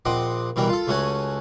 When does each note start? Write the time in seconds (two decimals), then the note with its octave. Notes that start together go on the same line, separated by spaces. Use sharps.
0.05 A#1 C4 D#5 F#5 D6
0.56 B2 E3 G3 A#4 G5
0.69 F4 A4
0.87 C#2 A3 C#4 F#4 F#5 G#5